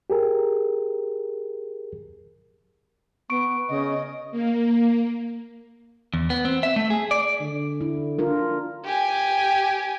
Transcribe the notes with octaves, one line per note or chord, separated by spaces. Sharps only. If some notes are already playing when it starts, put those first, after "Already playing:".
G4 G#4 A#4
B3 C#6 D7
C#3 D#5
A#3
E2
B3
C4
E5
A3
G#4
D5
D3
E4
D4 F4 A#4
G4 G#5